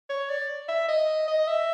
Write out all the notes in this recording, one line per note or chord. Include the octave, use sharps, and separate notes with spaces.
C#5
D5
E5
D#5
D#5
E5